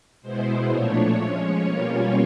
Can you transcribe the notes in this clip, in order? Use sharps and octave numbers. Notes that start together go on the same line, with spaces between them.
B2 G#3 B3 E4 C5
A#2 F3 A3 D4 C#5
F3 G#3 C#4
B2 G3 A#3 C#4 F4 C#5